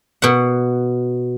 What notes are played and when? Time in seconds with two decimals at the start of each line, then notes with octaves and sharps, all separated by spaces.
0.22 B2 F#5